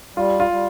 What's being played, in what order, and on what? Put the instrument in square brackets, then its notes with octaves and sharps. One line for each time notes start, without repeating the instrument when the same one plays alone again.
[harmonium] G3 [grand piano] F4
[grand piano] F4
[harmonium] G3